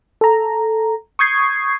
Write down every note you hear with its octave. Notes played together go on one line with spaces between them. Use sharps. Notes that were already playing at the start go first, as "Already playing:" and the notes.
A4 A#5
C#6 D#6 G6 G#6 C7